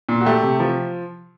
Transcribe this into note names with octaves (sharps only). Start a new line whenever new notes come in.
A#2
F#4
A3 G4
C3
F3